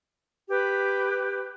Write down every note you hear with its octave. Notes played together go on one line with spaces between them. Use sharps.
G4 B4